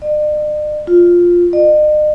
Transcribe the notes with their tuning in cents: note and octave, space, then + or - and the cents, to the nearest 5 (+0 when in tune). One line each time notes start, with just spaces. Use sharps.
D5 +45
F4 +5
D#5 -45